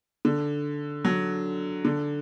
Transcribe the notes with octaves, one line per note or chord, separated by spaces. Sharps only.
D3
F#3
D3